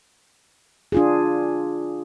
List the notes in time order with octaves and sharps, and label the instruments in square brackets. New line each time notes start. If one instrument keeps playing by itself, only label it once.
[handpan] D4 F4 G#4